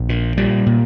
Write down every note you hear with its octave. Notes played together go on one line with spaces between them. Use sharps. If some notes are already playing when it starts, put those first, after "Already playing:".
Already playing: A#1
A#2
A#2 G3
A#2